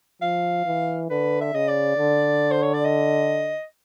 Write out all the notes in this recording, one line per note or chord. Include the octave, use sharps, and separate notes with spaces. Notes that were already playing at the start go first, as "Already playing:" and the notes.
F3 F5
E3
D3 B4
E5
C#3 D#5
D5
D3
C5
C#5
D5
D#5